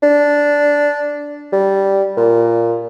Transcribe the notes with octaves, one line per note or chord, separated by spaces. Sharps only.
D4
G3
A#2